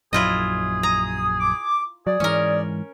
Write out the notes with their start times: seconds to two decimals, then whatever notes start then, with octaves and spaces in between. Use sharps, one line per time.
0.13 A#1 F#2 F#3 E4 F4 G#4 D#5
0.83 A#5 D#6
1.39 D6
2.07 F#3 G#4 D5
2.20 G#2 E3 G#3 C#4 A#4